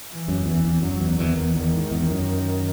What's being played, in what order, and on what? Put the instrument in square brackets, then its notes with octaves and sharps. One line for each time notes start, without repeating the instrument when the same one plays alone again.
[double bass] E3
[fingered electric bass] F#2
[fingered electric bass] E2 [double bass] E3
[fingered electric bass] E2
[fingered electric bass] F#2 [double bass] F#3
[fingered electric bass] E2
[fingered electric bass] E2 [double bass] D#3
[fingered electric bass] E2
[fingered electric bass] E2 [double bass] D#3
[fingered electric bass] G#2
E2
F#2